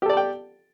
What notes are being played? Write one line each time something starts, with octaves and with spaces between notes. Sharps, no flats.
G4 A4 D5 G5 A5